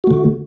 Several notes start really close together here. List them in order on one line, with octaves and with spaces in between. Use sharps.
F#4 A3 D3